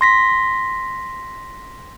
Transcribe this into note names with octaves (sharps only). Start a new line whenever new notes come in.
C6 A#6 B6